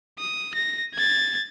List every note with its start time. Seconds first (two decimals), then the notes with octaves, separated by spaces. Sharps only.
0.19 D#6
0.55 A#6
0.95 G#6 A6